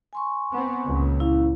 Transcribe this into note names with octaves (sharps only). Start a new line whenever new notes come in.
G#5 C6 C#6
B3 C4
C#2 A#2
C#4 E4 F5